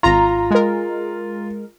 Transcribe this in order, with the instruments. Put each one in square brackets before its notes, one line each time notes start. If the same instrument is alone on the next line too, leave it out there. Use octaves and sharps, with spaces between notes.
[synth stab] G#1 A#5 [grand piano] F4
[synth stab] G#3 A#4